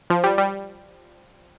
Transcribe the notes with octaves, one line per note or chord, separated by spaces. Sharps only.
F3
G3
G3